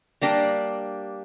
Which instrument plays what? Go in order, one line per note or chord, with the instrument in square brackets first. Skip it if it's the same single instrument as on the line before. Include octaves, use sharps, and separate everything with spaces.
[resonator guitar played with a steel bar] G3 A#3 D4 G4